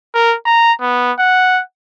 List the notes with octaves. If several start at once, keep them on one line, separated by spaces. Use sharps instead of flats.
A#4
A#5
B3
F#5